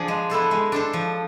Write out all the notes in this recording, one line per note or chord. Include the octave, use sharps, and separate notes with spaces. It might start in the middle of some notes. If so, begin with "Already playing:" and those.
Already playing: F3 D4 G#4
G#3
B3 E4 A4 C5
G#3
D4 A4 C5
F3